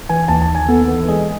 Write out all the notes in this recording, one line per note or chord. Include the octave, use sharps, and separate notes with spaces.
E3 G#5
D#2 A5
A5
D#2
G#5
B3 A4
E3
G#3 G#4